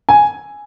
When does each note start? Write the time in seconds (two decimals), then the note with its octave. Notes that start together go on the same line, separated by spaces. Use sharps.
0.09 G#5